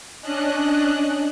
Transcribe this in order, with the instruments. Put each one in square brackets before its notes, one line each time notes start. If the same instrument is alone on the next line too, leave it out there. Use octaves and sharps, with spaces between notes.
[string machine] C#4 D4 D#5 F#6